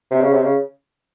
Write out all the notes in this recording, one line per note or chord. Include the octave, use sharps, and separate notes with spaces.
C3
C#3
C3
C#3